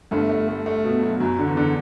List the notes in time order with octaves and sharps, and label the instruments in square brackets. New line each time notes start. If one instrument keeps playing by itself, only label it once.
[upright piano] G1 G2 [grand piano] A3
[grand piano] A3
A3
A3
B2
F#3
[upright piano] F#2 [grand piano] F#3
[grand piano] D3
[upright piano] E2
[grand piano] D3